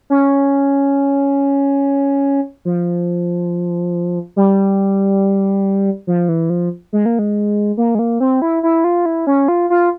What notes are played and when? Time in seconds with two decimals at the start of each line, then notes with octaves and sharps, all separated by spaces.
0.10 C#4
2.65 F3
4.36 G3
6.07 F3
6.29 E3
6.50 F3
6.93 G#3
7.06 A#3
7.19 G#3
7.77 A#3
7.95 G#3
7.99 A#3
8.20 C4
8.42 E4
8.63 E4
8.84 F4
9.06 E4
9.27 C#4
9.48 F4
9.70 F4